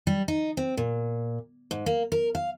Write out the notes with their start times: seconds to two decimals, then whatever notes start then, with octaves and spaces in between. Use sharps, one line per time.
0.07 G3
0.28 D#4
0.57 C4
0.77 A#2
1.71 G#2
1.86 A#3
2.12 A#4
2.35 F5